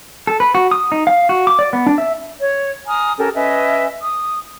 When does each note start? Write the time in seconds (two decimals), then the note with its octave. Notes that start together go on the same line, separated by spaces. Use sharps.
0.27 A4
0.40 B4
0.55 F#4
0.71 D#6
0.92 D#4
1.07 F5
1.29 F#4
1.47 D6
1.59 D5
1.73 B3
1.87 D4
1.98 E5
2.40 C#5
2.87 G#5 A#5 D#6 F6
3.18 C#4 G4 A4 A#4
3.34 C#4 B4 D#5 E5
4.01 D#6